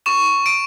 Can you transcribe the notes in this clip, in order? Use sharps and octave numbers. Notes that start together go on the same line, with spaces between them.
C#6 E7
D7